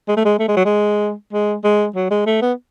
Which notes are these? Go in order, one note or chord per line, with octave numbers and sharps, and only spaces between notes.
G#3
A3
G#3
A3
G#3
F#3
G#3
G#3
G#3
F#3
G#3
A3
B3